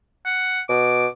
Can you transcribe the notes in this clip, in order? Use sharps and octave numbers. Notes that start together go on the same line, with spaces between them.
F#5
B2 D6